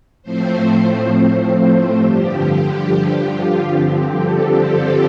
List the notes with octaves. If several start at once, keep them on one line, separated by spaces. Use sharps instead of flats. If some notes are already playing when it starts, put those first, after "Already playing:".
A2 F3 A3 C4 C5
C5
C5
C5
G2 D3 F3 G4
G4
F4
G2 D3 F3 C4 G4
A4
A4